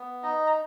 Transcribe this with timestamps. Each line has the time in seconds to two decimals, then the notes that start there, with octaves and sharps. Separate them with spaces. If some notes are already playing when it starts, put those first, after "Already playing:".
Already playing: B3
0.23 D#4 D#5
0.47 A#5